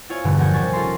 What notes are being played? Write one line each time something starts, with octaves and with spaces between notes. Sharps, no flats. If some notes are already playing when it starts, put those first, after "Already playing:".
E4 F4 C#5 F5 G#5
E1 G2 B2 D3
F3 A#4 F#5 G#5 G6 C#7
D#1 C3 G3 G#5 C#6 A6
C#4 F4 A4 A#4 A#5 C6